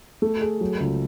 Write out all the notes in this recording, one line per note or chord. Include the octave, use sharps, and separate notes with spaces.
A3
G#4
F#3
C#2